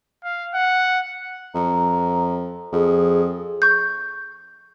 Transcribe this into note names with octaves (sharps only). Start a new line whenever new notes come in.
F5
F#5
F2 A#5
F2 G#4
C#6 G6